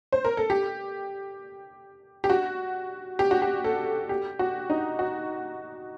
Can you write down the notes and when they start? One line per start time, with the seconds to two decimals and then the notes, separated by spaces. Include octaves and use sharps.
0.13 C5
0.25 A#4
0.37 A4
0.50 G4
2.24 G4
2.30 F#4
3.19 G4
3.31 F#4
3.42 G4
3.64 A4
4.09 G4
4.39 F#4
4.70 D#4
4.99 F#4